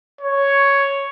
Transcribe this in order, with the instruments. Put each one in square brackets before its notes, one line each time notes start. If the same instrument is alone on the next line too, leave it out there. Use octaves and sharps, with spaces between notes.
[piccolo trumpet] C#5